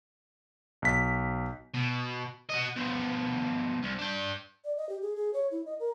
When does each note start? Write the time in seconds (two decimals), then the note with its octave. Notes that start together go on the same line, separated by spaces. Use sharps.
0.82 B1 B6
1.74 B2
2.50 F#4 D#5
2.76 B2 F3
3.83 C2
3.99 D4 G5
4.64 D5
4.77 D#5
4.89 G4
5.02 G#4
5.16 G#4
5.33 C#5
5.51 E4
5.66 D#5
5.79 A#4